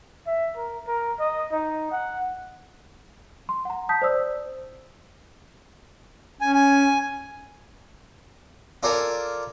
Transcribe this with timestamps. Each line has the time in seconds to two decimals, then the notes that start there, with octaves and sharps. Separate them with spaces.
0.27 E5
0.57 A#4
0.87 A#4
1.19 D#5
1.52 D#4
1.92 F#5
3.49 C6
3.65 F#5 A#5
3.89 A5 D#6 G6 B6
4.02 C5 D5 D#6 E6
6.41 C#4 G#5
6.54 G#5
8.83 F4 A4 A#4 D5 F5 G#5